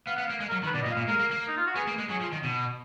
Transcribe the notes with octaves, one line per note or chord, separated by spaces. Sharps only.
B3 F5
F#5
B3
F5
A#3
G#3
A#4
F#3
D#3
B4
B2 D5
D#5
A#2
F5
A#2
G#3 A#4
A#3
A#3
D#4
F4
F#4
B3 G#4
A#3
G#3
F#3 G#4
F3
D#3
B2